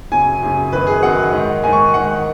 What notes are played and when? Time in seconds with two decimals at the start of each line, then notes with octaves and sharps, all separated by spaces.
0.12 F#2 C#3 G#5
0.42 F#2 C#3
0.73 F#2 D#3 B4
0.87 G#4
1.03 F#2 D#3 F#5
1.32 G#2 D#3
1.63 G#2 D#3 G#5
1.73 C#6
1.94 G#2 D#3 F#5